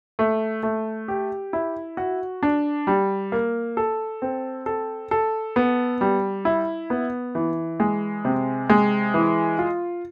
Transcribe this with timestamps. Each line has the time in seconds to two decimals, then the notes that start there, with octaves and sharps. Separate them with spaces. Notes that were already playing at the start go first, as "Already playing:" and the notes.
0.19 A3
0.63 A3
1.08 G4
1.53 E4
1.97 F#4
2.43 D4
2.87 G3
3.32 A#3
3.77 A4
4.22 C4
4.66 A4
5.11 A4
5.56 B3
6.01 G3
6.45 E4
6.90 B3
7.35 E3
7.80 G#3
8.25 C3
8.70 G#3
9.14 E3
9.59 F4